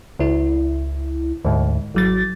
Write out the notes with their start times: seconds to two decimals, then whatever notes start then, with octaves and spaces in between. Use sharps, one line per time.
0.19 C#2 E4
1.45 D2 G#2
1.95 G#1 F#3 A6